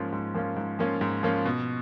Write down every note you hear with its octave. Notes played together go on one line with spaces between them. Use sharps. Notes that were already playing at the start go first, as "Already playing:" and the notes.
Already playing: G#2 F3 A#3 C#4 F4
G#2
F3 A#3 C#4 F4
G#2
F3 A#3 C#4 F4
G#2
F3 A#3 C#4 F4
B2